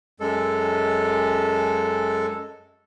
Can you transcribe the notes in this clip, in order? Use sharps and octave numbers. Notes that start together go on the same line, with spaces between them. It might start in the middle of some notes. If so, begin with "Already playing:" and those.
F#2 G#3 A4